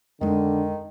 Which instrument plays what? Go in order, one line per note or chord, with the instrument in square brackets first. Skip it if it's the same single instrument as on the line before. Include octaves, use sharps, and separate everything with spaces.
[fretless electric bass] F2 G#3 [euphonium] D3 [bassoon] D#3